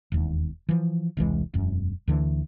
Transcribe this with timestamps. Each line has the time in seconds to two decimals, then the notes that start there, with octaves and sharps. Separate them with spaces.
0.12 E1 D#2
0.69 E3 F3
1.17 E1 C2 E3 G#3
1.54 E1 F#2
2.08 D2 D3 E3